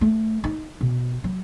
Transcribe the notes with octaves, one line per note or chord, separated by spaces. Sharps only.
A3
D#4
B2
F#3